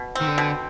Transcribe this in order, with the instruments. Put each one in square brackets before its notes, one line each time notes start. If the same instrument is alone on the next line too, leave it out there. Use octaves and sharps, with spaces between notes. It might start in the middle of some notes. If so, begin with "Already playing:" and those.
Already playing: [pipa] B2
C4
[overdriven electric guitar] D#3
D3
[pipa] B2